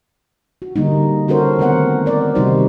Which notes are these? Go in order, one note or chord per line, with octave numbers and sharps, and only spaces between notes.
F#4
D3 G3 A#3 D#4
C#4 F#4 A4 A#4 C5
D#3 A3 B3 C4 A#4 F#5
A#4 D5
C3 D#3 G3 D#4 F#4 C5